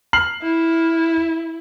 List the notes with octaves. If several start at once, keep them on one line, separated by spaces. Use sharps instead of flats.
F6 C7 F#7
E4